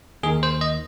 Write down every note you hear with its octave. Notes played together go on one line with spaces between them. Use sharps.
D#2 D#3 G#4
C5
D#5